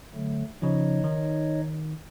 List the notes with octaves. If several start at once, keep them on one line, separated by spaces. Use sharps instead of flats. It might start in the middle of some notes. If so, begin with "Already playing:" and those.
D3 F#3 A3
C#3 F3 D#4 C#5 D#5
D#3